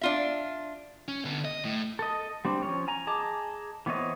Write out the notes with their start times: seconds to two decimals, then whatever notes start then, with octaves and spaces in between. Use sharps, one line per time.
0.01 D4 F4 E5
1.08 C#4
1.25 D3 B3
1.45 D#5
1.65 A2
1.99 A4 D#5
2.45 G3 C4 D4
2.63 F3 C#4 C#5
2.88 G#5 A#5
3.07 G#4 D#5 A5 A#5 D6
3.86 E3 B3 C4 C#5 D#5